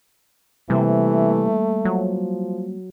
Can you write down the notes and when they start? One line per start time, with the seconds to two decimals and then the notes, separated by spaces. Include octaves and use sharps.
0.70 C3 E3 G3 A3 A#3
1.85 F3 F#3